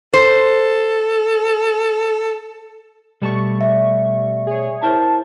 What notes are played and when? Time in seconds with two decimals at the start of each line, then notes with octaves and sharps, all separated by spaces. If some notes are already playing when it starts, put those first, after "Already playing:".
0.14 A4 C5
3.22 B2 G3 A3 A5 C#6
3.61 D5 E5
4.47 G#4 C#5
4.83 E4 A#4 C5 A5